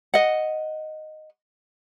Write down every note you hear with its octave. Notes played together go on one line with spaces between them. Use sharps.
D#5 F#5